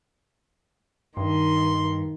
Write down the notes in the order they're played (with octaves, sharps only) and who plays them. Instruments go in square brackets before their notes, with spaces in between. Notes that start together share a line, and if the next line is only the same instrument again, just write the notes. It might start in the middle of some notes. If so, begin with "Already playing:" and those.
[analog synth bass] G2 [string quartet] D#3 [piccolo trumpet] C6